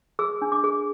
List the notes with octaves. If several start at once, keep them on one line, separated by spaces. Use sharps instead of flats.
G#4 E6
D4
D6
G#4